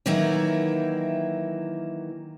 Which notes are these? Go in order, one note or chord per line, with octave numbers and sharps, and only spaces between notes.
D#3 E3 F#3 A#3 E4